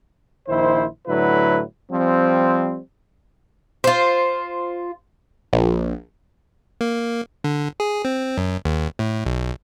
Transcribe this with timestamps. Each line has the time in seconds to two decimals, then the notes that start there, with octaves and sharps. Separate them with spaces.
0.49 A#1 D#3 E4 C5
1.08 A2 D3 F#3 E4 B4
1.92 F3 G3 C4
3.84 F4 C5
5.53 A#1
6.81 A#3
7.44 D3
7.80 G#4
8.05 C4
8.38 F#2
8.65 D#2
8.99 A2
9.26 B1